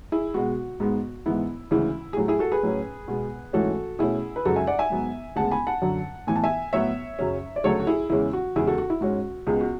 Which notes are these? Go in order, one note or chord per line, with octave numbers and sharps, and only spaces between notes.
E4 G#4
B2 G#3 B3 F#4
G#2 G#3 B3
G#2 E3 B3 E4
D2 C#3 E3 G#3 E4
G#4
A2 F#3 A3 F#4
E4 G#4
F#4 A4
G#4 B4
A2 F#3 C#4
B2 G#3 B3
G#2 E3 A3 C#4 F#4 A4
B2 A3 C#4 E4 G#4
B4
F#2 C#3 G#3 F#4 A4
E5 G#5
D5 F#5
E5 G#5
G#2 F#3 B3
D2 C#3 G#3 B3 F#5 A5
G#5 B5
F#5 A5
F#2 D3 F#3
A2 E3 B3 G#5
A5
E5 G#5
A2 F#3 B3 C#5 E5
F#2 C#3 F#3 C#4
D5
D2 C#3 F#3 A3 A4 C#5
F#4
E4 G#4
E2 C#3 E3 G#3 C#4 E4
F#4
E2 C#3 G#3 E4 G#4
F#4 A4
F#4
E4
G#2 G#3 C#4 F#4
C#2 C#3 G#3 B3 G#4
F#4